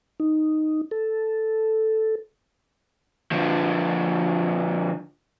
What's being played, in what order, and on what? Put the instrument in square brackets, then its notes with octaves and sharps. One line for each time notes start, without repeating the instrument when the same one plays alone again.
[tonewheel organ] D#4
A4
[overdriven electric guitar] D3 F3